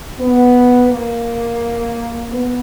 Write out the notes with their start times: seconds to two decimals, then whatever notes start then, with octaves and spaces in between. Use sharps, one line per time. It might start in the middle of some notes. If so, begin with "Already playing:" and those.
0.20 B3
0.89 A#3
2.30 B3